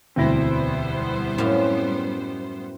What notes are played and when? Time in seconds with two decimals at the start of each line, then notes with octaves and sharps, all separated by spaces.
0.16 E1 D2 G3 B3 C4 E4 C5 A#6
1.38 F#2 A2 F5